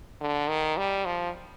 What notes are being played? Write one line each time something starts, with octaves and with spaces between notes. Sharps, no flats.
D3
D#3
G3
F3